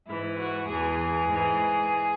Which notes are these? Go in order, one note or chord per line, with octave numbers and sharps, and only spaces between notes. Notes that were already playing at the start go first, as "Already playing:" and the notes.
G#2 E3 E4
F#4
E2 E3 G#4
G#2 E3